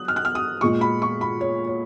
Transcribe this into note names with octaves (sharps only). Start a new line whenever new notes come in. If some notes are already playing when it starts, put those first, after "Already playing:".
Already playing: F#3 D#6 F#6
F6
F#6
F6
D#6
A#2 G#3 C#6
B5
C#6
B5
C#5
C#5